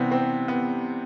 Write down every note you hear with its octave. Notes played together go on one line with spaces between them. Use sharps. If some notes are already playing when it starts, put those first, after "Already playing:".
Already playing: C3 E3 G3 B3 C4
C4
B3